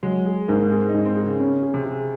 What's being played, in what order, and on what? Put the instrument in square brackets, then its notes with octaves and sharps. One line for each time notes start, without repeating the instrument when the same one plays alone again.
[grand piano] F#3 [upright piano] G#3
[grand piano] G#4
[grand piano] G#2 [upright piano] A#3
[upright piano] C4 [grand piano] G#4
[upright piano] D#4
[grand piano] G#2
[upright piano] C4
[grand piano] G#4
[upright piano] C#3
[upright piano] C#3 [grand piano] C#4
[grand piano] G#4
[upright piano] C3
[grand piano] G#4